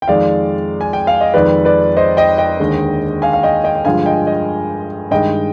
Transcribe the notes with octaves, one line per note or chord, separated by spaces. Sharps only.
G5
F2 D#3 G#3 D5 F5
G#5
G5
F5
D#5
F2 D#3 G#3 B4 D5
B4 D5
C5 D#5
D#5 G5
D#5 G5
D#2 D3 G#3
F5 G#5
F5
D#5 G5
D#5 G5
G5
G2 D3 F3 G#3 F5 G#5
D#5 G5
D#5 G5
G2 D#3 G#3 D#5 G5